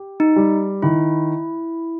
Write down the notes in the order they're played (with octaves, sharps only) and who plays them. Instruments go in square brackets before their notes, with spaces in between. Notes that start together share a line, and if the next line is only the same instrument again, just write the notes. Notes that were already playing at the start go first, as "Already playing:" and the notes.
Already playing: [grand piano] G4
[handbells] D#4
[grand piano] G3
[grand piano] D#3 [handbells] E4